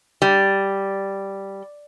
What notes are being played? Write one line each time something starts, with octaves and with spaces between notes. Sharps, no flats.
G3